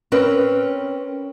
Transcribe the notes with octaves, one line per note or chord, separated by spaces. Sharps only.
C4 C#4 A#4 B4